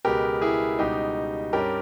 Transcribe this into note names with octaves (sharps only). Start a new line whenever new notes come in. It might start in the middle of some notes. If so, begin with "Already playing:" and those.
C#2 B2 G#3 B3 G4 A#4
E4 G#4
C#2 B2 G3 D#4 G4
G2 G3 C#4 G4 A#4